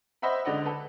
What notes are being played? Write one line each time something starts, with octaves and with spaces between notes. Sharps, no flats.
C5 D#5 E5 F#5 B5
C#2 D3 D5 D#5 F#5
A4 B4